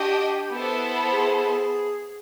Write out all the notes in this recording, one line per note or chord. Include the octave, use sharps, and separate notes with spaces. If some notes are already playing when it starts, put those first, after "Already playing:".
Already playing: D4 F#4 G4 D#5 G5
B3 E4 A4 C5
G#4